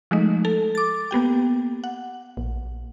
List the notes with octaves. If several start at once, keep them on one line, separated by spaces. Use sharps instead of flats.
F3 G#3 A3 D#4
A4
D6 A6
A#3 B3 G4 G5
F#5
A#1